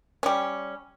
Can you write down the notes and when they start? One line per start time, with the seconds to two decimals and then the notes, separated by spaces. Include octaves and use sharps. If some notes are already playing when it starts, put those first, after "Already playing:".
0.23 G3 C#4